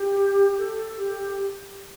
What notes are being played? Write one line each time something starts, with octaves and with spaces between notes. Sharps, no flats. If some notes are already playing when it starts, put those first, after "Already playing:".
Already playing: G4
A4
G4